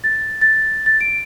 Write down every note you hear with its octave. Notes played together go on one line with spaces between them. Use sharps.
A6
A6
A6
D7